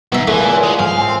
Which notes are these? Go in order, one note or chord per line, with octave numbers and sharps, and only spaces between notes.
G#2 B2 E5
C#2 A#2 E3 A3 G#5
G#3
G#2 F5
C4